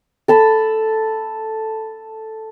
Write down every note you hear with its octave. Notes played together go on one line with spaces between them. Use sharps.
A4 A5 B5